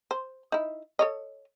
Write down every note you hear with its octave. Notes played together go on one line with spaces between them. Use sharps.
C5
D#4 E4
A4 C#5 D#5